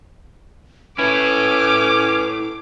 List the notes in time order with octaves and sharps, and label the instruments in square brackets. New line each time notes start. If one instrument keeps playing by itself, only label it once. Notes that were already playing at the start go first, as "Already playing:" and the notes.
[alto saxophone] C#4 [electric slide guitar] E4 A4 [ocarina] B4 [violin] D6